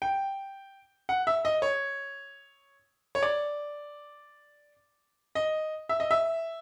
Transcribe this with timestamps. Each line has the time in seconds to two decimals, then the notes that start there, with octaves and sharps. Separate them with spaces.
0.02 G5
1.09 F#5
1.27 E5
1.45 D#5
1.62 C#5
3.15 C#5
3.23 D5
5.35 D#5
5.89 E5
6.00 D#5
6.11 E5